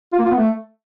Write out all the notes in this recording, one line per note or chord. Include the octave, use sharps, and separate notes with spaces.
F4
A#3
F4
B3
A3